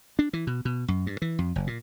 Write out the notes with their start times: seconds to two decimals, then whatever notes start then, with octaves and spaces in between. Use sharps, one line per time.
0.19 D4
0.33 E3
0.47 B2
0.65 B2
0.88 F#2
1.06 G2
1.22 E3
1.39 F2
1.56 F#1
1.67 A#2